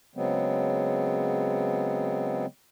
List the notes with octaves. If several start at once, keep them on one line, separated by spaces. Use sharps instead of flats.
C#3 F#3 G#3 B3 C4